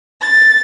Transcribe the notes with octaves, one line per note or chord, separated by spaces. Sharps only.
A6